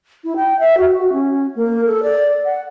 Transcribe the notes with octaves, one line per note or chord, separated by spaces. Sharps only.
E4
G5
E5
F#4
F#4
C#4
A#3
A4
D5
F#5